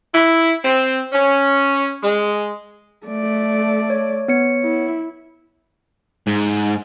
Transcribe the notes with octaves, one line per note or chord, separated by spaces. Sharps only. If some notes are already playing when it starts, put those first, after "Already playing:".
E4
C4
C#4
G#3
A3 D5
C#5
B3 C#5 C#7
E4
G#2